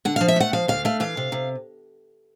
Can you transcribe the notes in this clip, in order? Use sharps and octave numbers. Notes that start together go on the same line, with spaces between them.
D3 F#5
F3 F5
E5
A3 F#5
F3 F5
D2 F5
A3 F5
E3 F5
C3
C3